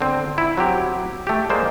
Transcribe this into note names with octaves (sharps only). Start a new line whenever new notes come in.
D3 C4
E4
F#3 C4 G4
A3 G4
G#3 A#3 C5 D5